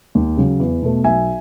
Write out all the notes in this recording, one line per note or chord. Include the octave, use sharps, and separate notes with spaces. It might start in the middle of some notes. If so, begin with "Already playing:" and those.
D#2
C#3 F#3
E2
B2 A3
B1 E5 G#5